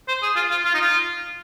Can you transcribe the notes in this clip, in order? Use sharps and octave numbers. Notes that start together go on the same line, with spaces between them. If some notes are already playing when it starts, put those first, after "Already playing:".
C5
G#4
F4
F4
F4
D#4
F4